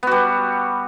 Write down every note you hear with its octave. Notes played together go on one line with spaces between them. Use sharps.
G3 B3 F#4